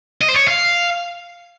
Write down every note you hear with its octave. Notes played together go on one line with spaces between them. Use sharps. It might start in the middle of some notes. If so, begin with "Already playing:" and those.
D#5
C5
C#5
F5